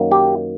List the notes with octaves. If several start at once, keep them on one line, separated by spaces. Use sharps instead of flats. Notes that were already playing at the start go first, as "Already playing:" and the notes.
Already playing: F#2 D#3 F#3 A#3
G4